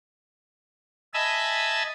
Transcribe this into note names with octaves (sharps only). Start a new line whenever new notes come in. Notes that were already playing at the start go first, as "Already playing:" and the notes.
D#5 E5 G#5 A5 B5 E6